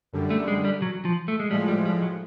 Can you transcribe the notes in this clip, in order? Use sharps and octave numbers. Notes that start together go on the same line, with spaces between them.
F#2 D3 G3
A3
G#3
G3
F#3
F3
A3
G#3
A2 F3 G3 G#3
G3
G3
F#3